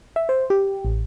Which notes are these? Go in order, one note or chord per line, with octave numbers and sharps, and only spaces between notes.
E5
C5
G4
A1